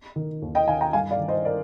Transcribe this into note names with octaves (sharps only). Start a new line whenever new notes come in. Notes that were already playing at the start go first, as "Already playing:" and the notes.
D#3
D#2
D#5 G5
D#3 F5 G#5
G5 A#5
G2 F5 G#5
D5 F5
D#3
C5 D#5
A#4 D5